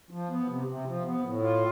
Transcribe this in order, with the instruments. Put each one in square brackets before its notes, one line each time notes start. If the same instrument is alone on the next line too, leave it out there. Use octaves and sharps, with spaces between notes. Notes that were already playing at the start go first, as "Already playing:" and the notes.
[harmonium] F3
B3
C3
C3
F3
B3
A2
F4